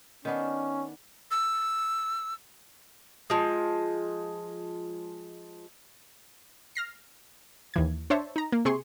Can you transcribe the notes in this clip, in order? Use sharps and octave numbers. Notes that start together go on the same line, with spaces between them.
D#3 B3 C#4 D4
E6
F3 G#3
F6 A#6 C7
D#2 E3 G#6
D4 C5 C#5 E5 A5
D#4 A#5
A#3
C3 G#4 C6 C#6